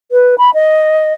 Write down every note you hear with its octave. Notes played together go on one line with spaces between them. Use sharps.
B4
B5
D#5